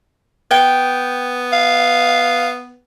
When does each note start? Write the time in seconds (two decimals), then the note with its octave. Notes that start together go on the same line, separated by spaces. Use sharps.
0.51 B3 G5
1.53 F5